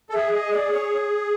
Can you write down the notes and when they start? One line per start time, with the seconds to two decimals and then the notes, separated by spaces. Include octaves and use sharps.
0.10 A4
0.14 G#4 E5
0.33 D#5
0.53 D5
0.72 C#5